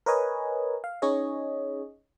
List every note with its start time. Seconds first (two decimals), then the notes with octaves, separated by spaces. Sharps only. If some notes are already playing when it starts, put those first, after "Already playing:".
0.06 A#4 B4 C#5 D#5 G#5
0.84 F5
1.02 C#4 D#4 G#4 C#5 D#5